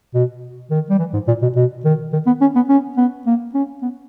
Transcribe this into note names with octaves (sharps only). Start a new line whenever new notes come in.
B2
D#3
G3
E3
G#2
A#2
B2
B2
D#3
D#3
B3
C#4
B3
C#4
B3
A#3
C#4
B3